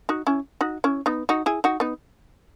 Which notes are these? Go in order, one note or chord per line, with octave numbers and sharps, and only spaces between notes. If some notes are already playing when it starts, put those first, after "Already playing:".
D#4 F#4
C#4 E4
D#4 F#4
C#4 E4
B3 D#4
D#4 F#4
E4 G#4
D#4 F#4
B3 D#4